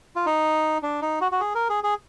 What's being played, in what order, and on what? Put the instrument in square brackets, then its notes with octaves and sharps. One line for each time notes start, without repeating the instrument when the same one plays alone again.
[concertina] F4
D#4
D4
D#4
F#4
F#4
G#4
A#4
G#4
G#4